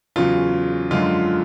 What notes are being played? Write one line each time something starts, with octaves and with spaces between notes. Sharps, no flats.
E2 C#3 F#3 F4
F#2 D3 F3 G#3 F4